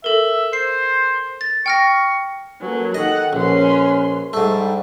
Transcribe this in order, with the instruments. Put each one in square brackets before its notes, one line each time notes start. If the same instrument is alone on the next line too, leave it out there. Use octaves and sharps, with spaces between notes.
[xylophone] A4 A#4 [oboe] E5
[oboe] C5 [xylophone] C7
[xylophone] A6
[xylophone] G5 F6 A#6 [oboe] C#6
[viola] F#3 A#3 [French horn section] C#4 A4 B4
[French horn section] D#3 [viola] A4 F#5 [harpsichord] D#5
[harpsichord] A#1 [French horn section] C#4 [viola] B4 C6
[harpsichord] G#2 A3 [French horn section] G3 [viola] D4